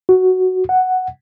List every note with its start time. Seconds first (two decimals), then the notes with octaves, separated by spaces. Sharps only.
0.09 F#4
0.69 F#5